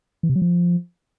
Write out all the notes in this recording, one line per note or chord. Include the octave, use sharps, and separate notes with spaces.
E3
C3
F#3
F3